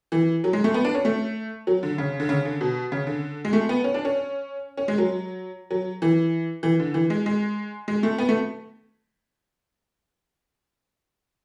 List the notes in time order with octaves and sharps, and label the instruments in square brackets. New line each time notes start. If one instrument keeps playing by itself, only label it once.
[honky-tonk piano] E3
F#3
G#3
A3
B3
D4
C#4
A3
F#3
D3
C#3
D3
C#3
D3
B2
C#3
D3
G#3
A3
B3
C#4
D4
C#4
C#4
G#3
F#3
F#3
E3
E3
D3
E3
G#3
G#3
G#3
A3
B3
A3